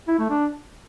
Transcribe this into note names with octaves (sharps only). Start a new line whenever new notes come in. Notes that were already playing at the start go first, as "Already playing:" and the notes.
E4
A3
D4